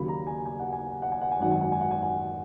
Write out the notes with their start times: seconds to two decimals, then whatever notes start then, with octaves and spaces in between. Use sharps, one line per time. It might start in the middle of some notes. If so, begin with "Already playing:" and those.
Already playing: D#2 C#3 F#3 B5
0.08 A#5
0.27 G#5
0.45 G#5
0.60 F#5
0.73 G#5
1.02 F#5
1.12 G#5
1.21 F#5
1.31 G#5
1.39 G#1 F#2 D#3 F#3 F#5
1.52 G#5
1.61 F#5
1.72 G#5
1.81 F#5
1.91 G#5
2.02 F#5